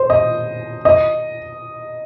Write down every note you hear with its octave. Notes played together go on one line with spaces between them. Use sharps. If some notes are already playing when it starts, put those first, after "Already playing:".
Already playing: C5
D#5
D#5